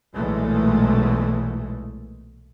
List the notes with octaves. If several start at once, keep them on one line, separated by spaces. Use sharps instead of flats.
B1 A#2 E3 G#3 A3